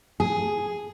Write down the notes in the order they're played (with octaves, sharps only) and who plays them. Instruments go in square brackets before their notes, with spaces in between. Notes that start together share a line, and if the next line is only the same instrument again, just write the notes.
[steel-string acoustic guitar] G#4